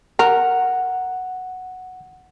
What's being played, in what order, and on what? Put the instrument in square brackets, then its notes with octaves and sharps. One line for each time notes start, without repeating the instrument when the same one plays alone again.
[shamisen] A#4 [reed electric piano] F#5